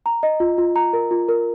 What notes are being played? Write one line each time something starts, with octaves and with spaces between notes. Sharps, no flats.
A#5
D#5
F4
F4
A#5
A#4
F4
A#4